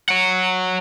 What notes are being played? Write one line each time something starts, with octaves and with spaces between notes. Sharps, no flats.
C#5 F#5